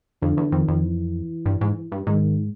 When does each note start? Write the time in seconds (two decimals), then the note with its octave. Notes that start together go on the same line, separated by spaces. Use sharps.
0.22 F2 D3
0.37 E2
0.52 F2 D#3
0.68 F2
0.84 E3
1.46 G2
1.61 G#2
1.92 G2
2.07 G#2 D#3